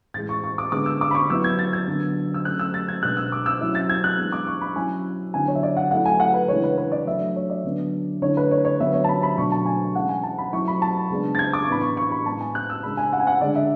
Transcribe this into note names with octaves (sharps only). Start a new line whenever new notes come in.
A2 E3 G#3 A6
C#6
C#6
D6
D3 G#3 B3 D6
E6
D6
B5
C#6
F#3 B3 E4 E6
G#6
A6
G#6
D3 F#3 B3
E6
F#3 A3 C#4 F#6
E6
A6
G#6
B2 G#3 B3 D4 F#6
E6
D6
E6
F#3 C#4 E4
A6
G#6
F#6
E3 G#3 B3 D4
D6
C#6
B5
F#3 C#4 E4 G#5
D3 F#3 B3 E4 G#5
C#5
E5
D5
F#5
F#3 A3 E4 F#5
G#5
F#5
B4
C#3 E3 G#3 D4 C#5
B4
B4
D5
F#3 A3 D4 E5
C#5
D5
D3 F#3 B3 D4
D3 A3 E4 C#5
B4
C#5
C#5
D3 F#3 B3 E5
C#5
A5
B5
B5
B2 F#3 A3 D4 C#6
A5
G#5
E3 G#3 C#4 E4 F#5
G#5
A5
B5
F#3 A3 E4 C#6
B5
A5
C#3 G#3 B3 D4
A6
G#6
D6
C#6
A2 E3 B3 D4 B5
C#6
C#6
B5
A2 G#3 B3 A5
G#5
F#6
E6
C#3 G#3 D4 B5
G#5
F#5
G#5
F#5
D3 G#3 D4 D5
E5